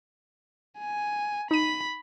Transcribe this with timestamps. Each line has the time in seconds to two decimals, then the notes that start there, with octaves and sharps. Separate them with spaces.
0.79 G#5
1.51 D#4 B5 D#7